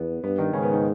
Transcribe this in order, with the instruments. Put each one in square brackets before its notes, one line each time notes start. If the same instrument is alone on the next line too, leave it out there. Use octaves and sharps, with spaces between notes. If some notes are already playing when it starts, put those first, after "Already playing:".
Already playing: [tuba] E2 [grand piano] B3
[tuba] G2 [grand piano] B3
[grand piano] D#3 D#4
[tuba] G#2 [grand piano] C#3 C#4
[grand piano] B3
D#3 D#4